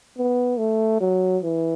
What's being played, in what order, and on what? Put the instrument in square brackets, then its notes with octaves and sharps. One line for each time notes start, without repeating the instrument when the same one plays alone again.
[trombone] B3
A3
F#3
E3